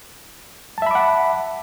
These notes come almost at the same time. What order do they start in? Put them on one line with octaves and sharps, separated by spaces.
A5 E5 B5 D6 F#5